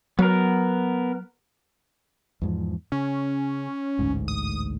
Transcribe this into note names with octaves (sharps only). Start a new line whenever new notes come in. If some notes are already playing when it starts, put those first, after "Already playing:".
F#3 B3 A#4
E2 G#2 F3
C#3 C#4
A1 D2 G#2
D#6